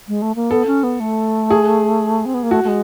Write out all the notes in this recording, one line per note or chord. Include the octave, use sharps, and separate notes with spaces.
G#3
A3
A#3
B3 A4
C#4
B3
A3
G#4
C4
B3
A#3
A3 F#4
A3
G#3